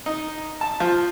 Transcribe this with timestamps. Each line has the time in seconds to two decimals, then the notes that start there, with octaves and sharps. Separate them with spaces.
0.06 D#4
0.61 A5
0.80 F3